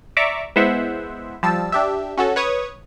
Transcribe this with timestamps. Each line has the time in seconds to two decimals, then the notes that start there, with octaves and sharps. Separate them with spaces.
0.17 D5 E5 A#5 C#6 D6
0.56 G#3 B3 E4 C5 E5 F#5
1.43 F3 G3 A5 E6
1.72 D4 G4 E5
2.17 C#4 F#4 A4
2.36 B4 C#5 C#6 D#6